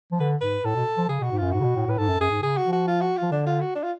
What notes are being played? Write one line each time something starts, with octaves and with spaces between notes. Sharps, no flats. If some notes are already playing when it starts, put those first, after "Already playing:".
F3
D3 B4
G#2 B4
A2 A4
B2
F3
C#3 G#4
B2 F#4
G#2
F#2 F4
G#2 F#4
C#3
B2
A2
A2 B4
G#2 A4
F#2
F#2 G#4
G#2
C#3 G#4
F#4
F3
F#4
F4
F#4
F4
F3
D3 D4
F4
F#4
D4
F4